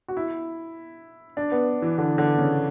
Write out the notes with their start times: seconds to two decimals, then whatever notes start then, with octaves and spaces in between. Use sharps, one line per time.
0.08 F#4
0.17 E4
1.37 D4
1.52 B3
1.82 E3
1.98 D3
2.18 D3
2.38 C#3